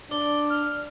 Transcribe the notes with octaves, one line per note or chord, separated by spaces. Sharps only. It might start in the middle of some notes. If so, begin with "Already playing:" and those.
D4 D5 G7
F6